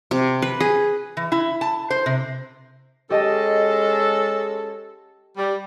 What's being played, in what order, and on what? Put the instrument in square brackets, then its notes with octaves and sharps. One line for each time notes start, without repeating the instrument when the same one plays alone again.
[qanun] C3
B4
G#4
[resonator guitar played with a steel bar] E3
E4
A5
C5
C3
[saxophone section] G#3 C#4 A4 [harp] G4 D#5 A5
[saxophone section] G3